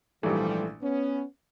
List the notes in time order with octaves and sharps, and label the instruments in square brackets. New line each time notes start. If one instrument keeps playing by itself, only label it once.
[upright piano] A#1 G#2 E3 A3 [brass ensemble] F3 G3
[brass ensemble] B3 C#4